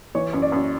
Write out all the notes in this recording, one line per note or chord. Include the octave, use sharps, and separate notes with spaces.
E3 C#5
F#2
D5
F#2